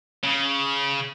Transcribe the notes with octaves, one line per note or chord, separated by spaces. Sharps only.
C#3